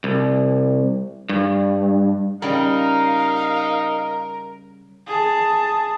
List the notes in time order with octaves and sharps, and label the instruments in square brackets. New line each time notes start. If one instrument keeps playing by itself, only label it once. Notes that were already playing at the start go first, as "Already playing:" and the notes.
[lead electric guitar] C2
G2
[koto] C#3 G3 [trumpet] D#4 [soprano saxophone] A#4 [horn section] F5
[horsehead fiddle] G#4 A5